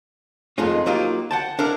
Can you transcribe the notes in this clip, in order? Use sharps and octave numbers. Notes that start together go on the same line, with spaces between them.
F2 D#3 G#3 A3 D#4 F4
F#3 A#3 D#4 F4 G4
F#5 G5 A5
D4 E4 A#4